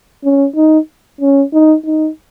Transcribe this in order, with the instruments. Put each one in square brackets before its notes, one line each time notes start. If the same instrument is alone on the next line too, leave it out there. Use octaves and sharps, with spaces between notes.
[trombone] C#4
D#4
C#4
D#4
D#4